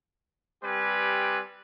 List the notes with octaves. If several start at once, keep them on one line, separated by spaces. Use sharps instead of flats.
G3 C4 G4 B4 G#5